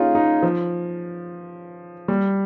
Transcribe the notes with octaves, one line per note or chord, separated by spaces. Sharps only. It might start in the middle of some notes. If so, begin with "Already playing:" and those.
Already playing: C#4 D#4 F4 G#4
D#4
F3
G3